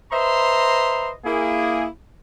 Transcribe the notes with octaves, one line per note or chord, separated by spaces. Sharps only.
B4 C5 D#5 E5 A#5 C6
A#3 E4 G#4